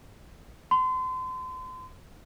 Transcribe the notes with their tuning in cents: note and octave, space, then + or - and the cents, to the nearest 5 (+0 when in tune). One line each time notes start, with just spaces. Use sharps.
C6 -35